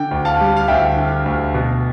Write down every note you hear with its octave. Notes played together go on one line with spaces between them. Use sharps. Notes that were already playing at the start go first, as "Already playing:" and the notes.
Already playing: D3 G5
D2
F5 A5
G3
F5
D2 E5 G5
D3
D2
B2